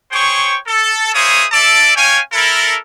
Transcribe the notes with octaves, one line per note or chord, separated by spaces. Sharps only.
G#4 C5 C#5 G5 C#6
A4
A#3 G#4 C5 C#5 E5 D#6
A4 D5 E5 A5 D6
C#4 C#5 F5 G5 G#5
E4 A4 A#4